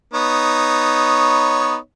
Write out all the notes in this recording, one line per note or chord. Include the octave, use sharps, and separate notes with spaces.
B3 D#4 C#5